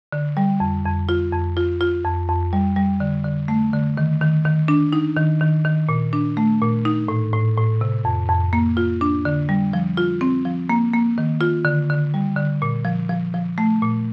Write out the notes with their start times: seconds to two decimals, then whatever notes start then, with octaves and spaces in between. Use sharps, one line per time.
0.12 D3
0.37 G3
0.60 F2
0.85 F2
1.09 F4
1.33 F2
1.57 F4
1.81 F4
2.05 F2
2.29 F2
2.53 G3
2.76 G3
3.00 D3
3.24 D3
3.48 A3
3.73 D3
3.97 D#3
4.21 D#3
4.45 D#3
4.68 D4
4.93 D#4
5.16 D#3
5.41 D#3
5.65 D#3
5.89 A#2
6.13 D4
6.37 A3
6.62 A#2
6.85 D#4
7.08 A2
7.33 A2
7.58 A2
7.81 C3
8.05 F2
8.29 F2
8.53 A#3
8.77 F4
9.01 D4
9.25 D3
9.49 G3
9.73 F3
9.97 F4
10.21 C4
10.45 F3
10.69 A#3
10.93 A#3
11.18 D#3
11.41 F4
11.65 D3
11.90 D3
12.14 G3
12.37 D3
12.62 A#2
12.85 F3
13.09 F3
13.34 F3
13.58 A3
13.82 A#2